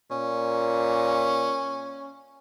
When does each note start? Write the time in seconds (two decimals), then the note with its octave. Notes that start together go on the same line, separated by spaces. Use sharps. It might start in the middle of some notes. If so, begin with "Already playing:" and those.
0.11 A#2 C#4